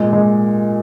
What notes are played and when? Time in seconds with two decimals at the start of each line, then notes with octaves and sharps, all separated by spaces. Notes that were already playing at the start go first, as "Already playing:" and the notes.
Already playing: A#2 G#3
0.13 G#3